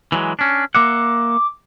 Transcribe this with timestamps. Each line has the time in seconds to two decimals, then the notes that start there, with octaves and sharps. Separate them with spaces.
0.12 E3 F#3 G#3
0.39 C#4 D4
0.75 A#3 E5 F#5 D6